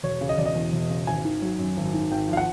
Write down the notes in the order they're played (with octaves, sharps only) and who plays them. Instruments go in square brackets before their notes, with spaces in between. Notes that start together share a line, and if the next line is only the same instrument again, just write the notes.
[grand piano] E1 C#5
C#3
D#5
E1 D5
D#5
E2
E1
C#3
G#1 G#5
D#3
F#3
F#2
G#1
D#3
G#1 G5
F3 F5
F#5